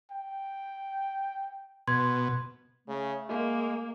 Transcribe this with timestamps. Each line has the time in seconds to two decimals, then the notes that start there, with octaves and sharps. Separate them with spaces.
0.11 G5
1.88 B2 C6 G#6
2.88 C#3 A3
3.29 G#3 A#3